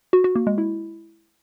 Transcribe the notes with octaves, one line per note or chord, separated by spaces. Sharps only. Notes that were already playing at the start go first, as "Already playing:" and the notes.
F#4
F#4
A#3
G#3
E4